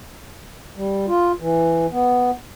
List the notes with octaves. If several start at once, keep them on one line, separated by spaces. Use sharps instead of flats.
G3
F4
E3
B3